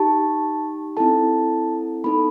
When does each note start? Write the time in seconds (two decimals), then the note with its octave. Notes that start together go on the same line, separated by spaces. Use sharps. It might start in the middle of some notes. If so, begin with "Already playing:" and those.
Already playing: D#4 G4 A5
0.97 C4 E4 A4 A5
2.04 B3 D#4 A4 B5